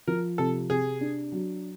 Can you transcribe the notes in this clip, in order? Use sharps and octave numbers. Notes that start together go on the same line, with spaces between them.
F3 A#4
C3 A4
C3 G#4
D4
F#3